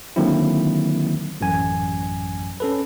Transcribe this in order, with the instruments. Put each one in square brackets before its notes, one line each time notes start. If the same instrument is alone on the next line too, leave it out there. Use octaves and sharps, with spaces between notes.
[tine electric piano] D3 D#3 F#3 A#3 C4 E4
A1 F#2 G#5
C#4 A4 B4